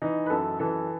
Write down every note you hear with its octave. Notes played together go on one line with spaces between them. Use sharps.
E3 D#4
B4
F#2 A4
E3 A4